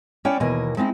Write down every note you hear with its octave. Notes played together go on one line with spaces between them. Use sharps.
C#4 D4 E4 C#5 D5 G5
D#2 B2 E3 A#3 D#5 G#5
G#3 C4 D#4 E4